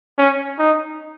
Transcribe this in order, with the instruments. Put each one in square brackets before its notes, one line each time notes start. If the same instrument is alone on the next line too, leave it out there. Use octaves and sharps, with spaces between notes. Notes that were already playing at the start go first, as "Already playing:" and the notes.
[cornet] C#4
D#4